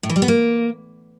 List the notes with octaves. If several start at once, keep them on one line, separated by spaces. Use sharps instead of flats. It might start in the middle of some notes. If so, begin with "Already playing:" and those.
A2
E3
G3
B3
A#3